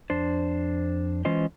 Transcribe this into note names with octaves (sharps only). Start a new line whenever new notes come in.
F2 D4 C5
E3 G#3 C#4 F4 C5 D#5